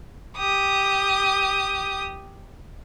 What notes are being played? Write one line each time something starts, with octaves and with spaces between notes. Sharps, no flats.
G4 D#6